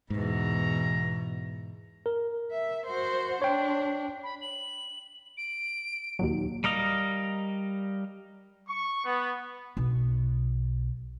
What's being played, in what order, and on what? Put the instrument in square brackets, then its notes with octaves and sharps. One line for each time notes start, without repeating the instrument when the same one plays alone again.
[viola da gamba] E2 B2 [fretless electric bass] G#2 [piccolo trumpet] A#5
[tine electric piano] A#4
[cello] E5
F#4 C5
[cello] D4 [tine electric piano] C#5 G5
[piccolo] B5
F#7
D7
[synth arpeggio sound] D#2 A#2 F#3
[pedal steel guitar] G3 A#4 D#5 F5
[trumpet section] C#6
B3
[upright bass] B1